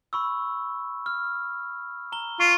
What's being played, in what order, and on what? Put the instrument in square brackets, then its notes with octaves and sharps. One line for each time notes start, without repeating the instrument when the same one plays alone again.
[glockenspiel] B5 C#6 E6
F6
A#5 G7
[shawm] F4 [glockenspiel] C#6 G7